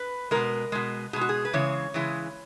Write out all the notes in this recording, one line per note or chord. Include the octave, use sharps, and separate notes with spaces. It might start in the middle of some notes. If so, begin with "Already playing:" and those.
Already playing: B4
B2 G#3 A#4
B2 G#3
B2 G#3 G#4
F#4
G#4
B4
C#3 E3 G#3 C#5
C#3 E3 G#3